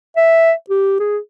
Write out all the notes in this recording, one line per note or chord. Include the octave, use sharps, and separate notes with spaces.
E5
G4
G#4